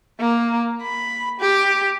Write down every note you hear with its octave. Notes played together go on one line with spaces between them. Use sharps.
A#3
B5
G4